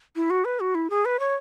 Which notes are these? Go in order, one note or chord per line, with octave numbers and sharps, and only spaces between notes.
E4
F#4
B4
F#4
E4
G#4
B4
C#5